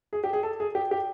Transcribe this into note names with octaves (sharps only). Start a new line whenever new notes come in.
G#4
G4
G#4
A4
G#4
G4
G4